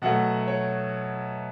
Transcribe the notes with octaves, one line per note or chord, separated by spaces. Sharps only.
B2 F#3 A3 F#5
C#5